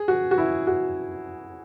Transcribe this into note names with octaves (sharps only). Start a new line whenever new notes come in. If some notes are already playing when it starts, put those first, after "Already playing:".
Already playing: G#4
F#4
F#4
E4
F#4